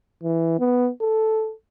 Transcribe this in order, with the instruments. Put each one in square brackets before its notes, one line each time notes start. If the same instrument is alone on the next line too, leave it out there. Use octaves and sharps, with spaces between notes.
[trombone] E3
B3
A4